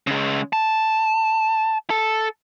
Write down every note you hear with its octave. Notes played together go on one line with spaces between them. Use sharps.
C#3 G#3
A5
A4